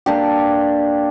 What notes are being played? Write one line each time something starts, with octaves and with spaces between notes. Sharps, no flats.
A#3 D4 G4